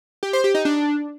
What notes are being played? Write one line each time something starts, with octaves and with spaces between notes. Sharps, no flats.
G4
C5
G4
D#4
D4